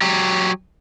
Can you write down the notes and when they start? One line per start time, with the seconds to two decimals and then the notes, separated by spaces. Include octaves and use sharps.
0.02 F#3 G4